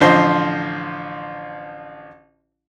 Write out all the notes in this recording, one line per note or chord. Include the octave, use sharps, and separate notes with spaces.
A1 D3 F3 C5 D#5 C6